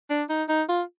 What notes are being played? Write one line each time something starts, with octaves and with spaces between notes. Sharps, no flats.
D4
D#4
D#4
F4